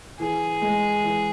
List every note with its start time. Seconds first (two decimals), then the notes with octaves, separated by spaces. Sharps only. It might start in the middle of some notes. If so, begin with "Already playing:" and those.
0.19 E3 G#4
0.62 G#3
1.04 E3